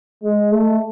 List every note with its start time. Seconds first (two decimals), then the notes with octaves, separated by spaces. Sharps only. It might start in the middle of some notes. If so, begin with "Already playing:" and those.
0.23 G#3
0.51 A3